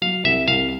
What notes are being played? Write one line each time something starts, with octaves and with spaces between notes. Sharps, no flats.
F#3 F5
C2 E5
C2 F5